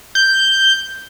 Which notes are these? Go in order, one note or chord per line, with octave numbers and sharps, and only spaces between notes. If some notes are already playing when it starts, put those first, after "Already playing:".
G6